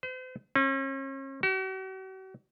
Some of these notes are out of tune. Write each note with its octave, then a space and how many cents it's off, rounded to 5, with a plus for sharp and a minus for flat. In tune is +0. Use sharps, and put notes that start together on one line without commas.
C5 -40
C#4 -40
F#4 +45